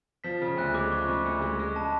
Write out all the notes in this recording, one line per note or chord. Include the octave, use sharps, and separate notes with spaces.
F3 B6
C#3
D2 F#6
G#3 D6
F3 C#6
C#3
D2
G#3
G#3
C#3 A5